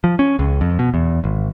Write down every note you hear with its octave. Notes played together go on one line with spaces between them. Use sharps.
F3
C#4
C#2
F2
B2
E2
G#1